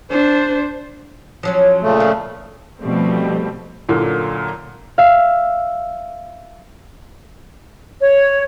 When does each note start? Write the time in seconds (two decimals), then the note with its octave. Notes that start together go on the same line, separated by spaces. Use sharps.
0.10 D4 C5
1.43 F3 F#3 C#4
1.82 A#2 C#3 A3
2.00 F3
2.81 B2 F3 G3 A3 C4
3.89 F#2 A#2 D3 A#3
4.98 E5 F5
8.01 C#5